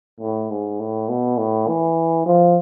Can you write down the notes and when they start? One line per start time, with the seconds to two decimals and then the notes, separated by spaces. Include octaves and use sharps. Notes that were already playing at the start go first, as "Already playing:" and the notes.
0.21 A2
0.51 G#2
0.80 A2
1.09 B2
1.38 A2
1.68 E3
2.26 F3